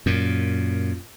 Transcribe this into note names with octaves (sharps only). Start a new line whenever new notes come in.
F#2 A#2